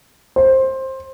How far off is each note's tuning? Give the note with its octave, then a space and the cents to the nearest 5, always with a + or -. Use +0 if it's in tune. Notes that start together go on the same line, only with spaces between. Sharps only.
C5 +15